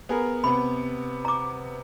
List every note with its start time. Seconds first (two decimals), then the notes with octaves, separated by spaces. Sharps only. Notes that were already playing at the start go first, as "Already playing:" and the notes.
0.09 B3 G#4 A#4
0.44 C3 B3 B5
1.25 A#5 D6